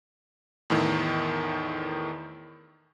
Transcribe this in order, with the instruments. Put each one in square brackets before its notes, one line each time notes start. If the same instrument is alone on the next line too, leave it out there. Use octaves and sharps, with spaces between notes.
[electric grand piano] E2 A2 D#3